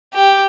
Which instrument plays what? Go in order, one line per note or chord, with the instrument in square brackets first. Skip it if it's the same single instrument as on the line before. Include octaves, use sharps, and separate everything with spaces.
[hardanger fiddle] G4